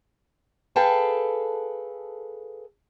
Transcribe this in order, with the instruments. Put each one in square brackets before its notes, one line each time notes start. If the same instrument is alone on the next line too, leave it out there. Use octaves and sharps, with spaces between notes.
[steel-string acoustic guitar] G#4 A4 B4 F5 G5 A5